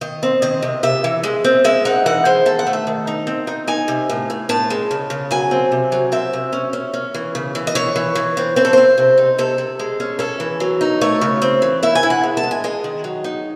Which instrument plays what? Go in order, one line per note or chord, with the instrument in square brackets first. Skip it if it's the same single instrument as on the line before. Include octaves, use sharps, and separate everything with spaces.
[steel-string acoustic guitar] D#3 D#5
C4
D#3 D#5
C3
C3 E5
E3
G#3
C4
G#3 E5
D#4 F#5
E3 F#5
G#3 C5
D#3 A4
F#5
A3
E5
D#3
D#4
C4
D#4
D#4 G#5
C3
A2
A2
A2 A5
G#3
C#3
C#3
F#3 G#5
C4
C3
F#3
C4 E5
C3
C#4
C#4
C#4
E3
C#3
E3
D#5
E3 C#5
E3
E3
C4
C4 C5
A4
C4 C5
C3
D#4
C3 A4
C3
G#3
C#4
C#4 A4
E3
F#3
D#4
A3 C#5
C#3
C4
E3
E4 E5
G#5
E4
F#5
G#3
A5
G#3
G#5
G#3 D#5
D#3
F#3
D#4